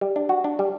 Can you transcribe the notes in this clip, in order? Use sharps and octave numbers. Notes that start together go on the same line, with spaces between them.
G3
D4
F#4
D4
G3